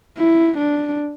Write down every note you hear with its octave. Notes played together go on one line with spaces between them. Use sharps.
E4
D4